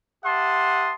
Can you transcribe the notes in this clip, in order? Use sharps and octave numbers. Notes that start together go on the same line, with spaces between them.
G4 E5 F#5 A5 C6 D#6